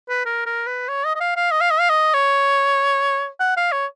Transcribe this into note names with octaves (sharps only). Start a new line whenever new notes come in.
B4
A#4
A#4
B4
C#5
D#5
D#5
F5
F5
D#5
F5
D#5
F5
D#5
C#5
F#5
F5
C#5